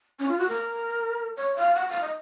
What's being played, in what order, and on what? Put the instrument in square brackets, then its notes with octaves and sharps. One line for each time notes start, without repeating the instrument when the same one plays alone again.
[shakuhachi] C#4
F4
F#4
A#4
C#5
F5
F#5
F5
D#5